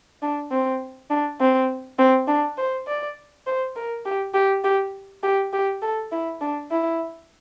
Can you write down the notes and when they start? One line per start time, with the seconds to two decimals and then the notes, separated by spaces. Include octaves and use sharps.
0.22 D4
0.51 C4
1.10 D4
1.40 C4
1.99 C4
2.28 D4
2.57 C5
2.87 D5
3.46 C5
3.76 A#4
4.05 G4
4.34 G4
4.64 G4
5.23 G4
5.53 G4
5.82 A4
6.12 E4
6.41 D4
6.71 E4